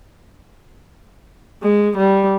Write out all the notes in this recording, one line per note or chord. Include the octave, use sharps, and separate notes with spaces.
G#3
G3